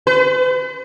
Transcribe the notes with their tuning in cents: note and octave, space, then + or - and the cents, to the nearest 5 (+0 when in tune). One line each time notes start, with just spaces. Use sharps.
B4 +45